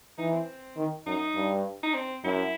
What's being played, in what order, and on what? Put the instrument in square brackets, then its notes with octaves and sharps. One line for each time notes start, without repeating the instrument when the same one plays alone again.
[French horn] E3 [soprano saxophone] D#4
[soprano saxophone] C4
[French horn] D#3
[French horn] F#2 [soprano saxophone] D#4
[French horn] G2
[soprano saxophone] D#4
C4
[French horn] F#2 [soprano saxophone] E4